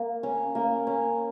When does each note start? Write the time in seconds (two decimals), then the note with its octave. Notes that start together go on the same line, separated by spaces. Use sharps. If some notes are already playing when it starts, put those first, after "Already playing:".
Already playing: A#3
0.23 C#4
0.55 A#3
0.87 C#4